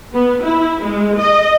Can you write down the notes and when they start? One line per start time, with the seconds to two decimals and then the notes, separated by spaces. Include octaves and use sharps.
0.14 B3
0.44 E4
0.84 G#3
1.19 D#5